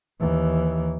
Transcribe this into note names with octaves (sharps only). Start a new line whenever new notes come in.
D#2 E3